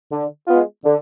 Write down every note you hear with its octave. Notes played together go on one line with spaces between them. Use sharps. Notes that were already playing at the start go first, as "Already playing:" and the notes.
D3
G#3 B3 F4
D3